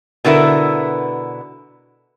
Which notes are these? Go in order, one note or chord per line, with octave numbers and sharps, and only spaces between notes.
B2 D3 B3 E4 A#4